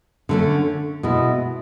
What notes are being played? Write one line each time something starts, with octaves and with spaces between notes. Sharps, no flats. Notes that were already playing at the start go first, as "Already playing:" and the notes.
D3 A3 C#4
B2 G#3 B3 E4